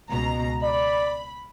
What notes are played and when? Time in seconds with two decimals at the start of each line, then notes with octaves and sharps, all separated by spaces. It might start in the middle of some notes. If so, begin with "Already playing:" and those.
0.10 C#2 B2 A#5
0.63 D5 B5